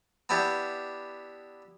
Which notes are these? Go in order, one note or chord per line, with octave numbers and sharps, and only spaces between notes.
B3 D4 E4 G4